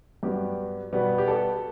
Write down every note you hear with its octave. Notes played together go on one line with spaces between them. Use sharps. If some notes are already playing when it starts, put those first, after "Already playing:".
G2 F#3 B3 G4
B2 G3 B3
G4
A4